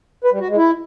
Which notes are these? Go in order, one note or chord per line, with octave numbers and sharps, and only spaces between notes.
B4
G3
F#4
G#3
E4